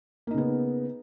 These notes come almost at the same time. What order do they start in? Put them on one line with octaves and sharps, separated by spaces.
A#3 D#4 C#3 B3